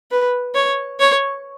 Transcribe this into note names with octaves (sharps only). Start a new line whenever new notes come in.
B4
C#5
C#5